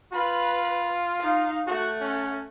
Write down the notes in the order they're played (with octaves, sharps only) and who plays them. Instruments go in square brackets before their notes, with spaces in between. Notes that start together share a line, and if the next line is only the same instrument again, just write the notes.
[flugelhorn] F4 [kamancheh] B4 B5
[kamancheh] D#4 F5
[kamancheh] A3 F#5 [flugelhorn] F#4
[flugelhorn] C#4